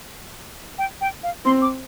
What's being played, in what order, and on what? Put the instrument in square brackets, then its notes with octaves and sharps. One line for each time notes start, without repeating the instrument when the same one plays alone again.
[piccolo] G5
G5
F5
[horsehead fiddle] C4 [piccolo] C6
[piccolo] D6